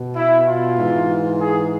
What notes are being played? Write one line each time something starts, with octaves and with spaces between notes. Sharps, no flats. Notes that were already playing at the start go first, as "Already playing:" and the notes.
Already playing: B2
E4
F4
G#2 E3
G#4